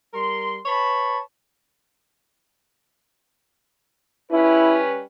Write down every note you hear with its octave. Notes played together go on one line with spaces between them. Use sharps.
G3 A#4 C6
B4 C#5 A5 B5
G3 C#4 E4 B4